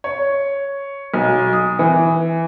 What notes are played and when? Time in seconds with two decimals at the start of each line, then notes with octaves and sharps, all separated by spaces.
0.04 C#5
1.14 B1
1.53 D#6
1.79 E3